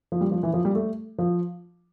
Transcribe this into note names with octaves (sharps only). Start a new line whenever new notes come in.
F3
G3
F3
E3
F3
G3
A3
F3